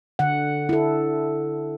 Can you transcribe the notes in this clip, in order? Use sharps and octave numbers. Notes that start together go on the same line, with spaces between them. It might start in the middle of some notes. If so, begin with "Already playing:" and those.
D3 F#5
E4 A4